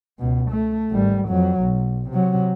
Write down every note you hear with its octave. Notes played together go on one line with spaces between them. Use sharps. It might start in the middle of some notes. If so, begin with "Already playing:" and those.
C#2 B2
A3
G#1 G3
F2 F#3
B1
C3 F#3